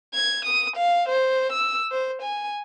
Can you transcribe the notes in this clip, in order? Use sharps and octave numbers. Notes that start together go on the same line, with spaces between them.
G#6
D#6
F5
C5
E6
C5
G#5